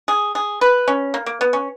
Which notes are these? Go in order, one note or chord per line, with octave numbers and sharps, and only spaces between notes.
G#4
G#4
B4
C#4
A#3
A#3
B3
C#4